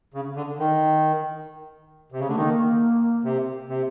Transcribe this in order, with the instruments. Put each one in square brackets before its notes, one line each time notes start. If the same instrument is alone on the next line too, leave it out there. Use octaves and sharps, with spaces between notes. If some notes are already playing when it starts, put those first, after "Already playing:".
[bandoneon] C#3
D3
D#3
C3
C#3
[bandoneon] D3 [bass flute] A3
[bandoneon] D#3 [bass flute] A#3
[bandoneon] C3
C3